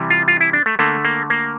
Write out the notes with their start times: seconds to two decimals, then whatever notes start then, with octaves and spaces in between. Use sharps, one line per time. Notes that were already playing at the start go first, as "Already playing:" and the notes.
Already playing: C3 E3 G3
0.10 F4
0.28 F4
0.41 E4
0.53 D4
0.66 A3
0.79 D3 A3 A#3
1.05 A#3
1.30 A#3